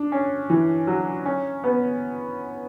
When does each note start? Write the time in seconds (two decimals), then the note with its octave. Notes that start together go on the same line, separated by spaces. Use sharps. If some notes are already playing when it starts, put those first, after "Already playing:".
Already playing: D4
0.12 C#4
0.50 E3
0.87 F#3
1.26 C#4
1.64 B3